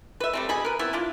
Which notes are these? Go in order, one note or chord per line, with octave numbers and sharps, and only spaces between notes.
B4 E5
G3 A3 C4
B2 G#4 B5
A#4 B4
B3 C4 E4 E5
D4 E4 F4